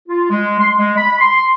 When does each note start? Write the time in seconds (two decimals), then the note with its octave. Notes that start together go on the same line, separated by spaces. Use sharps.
0.08 F4
0.30 G#3
0.59 C6
0.77 G#3
0.97 B5
1.18 C6